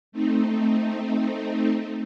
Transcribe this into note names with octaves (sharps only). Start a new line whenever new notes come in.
A3 C4 D#4